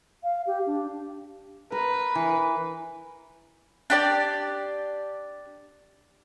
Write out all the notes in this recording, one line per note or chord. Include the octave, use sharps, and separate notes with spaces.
F5
G4
D4
A#4 B4
E3
D4 G4 D5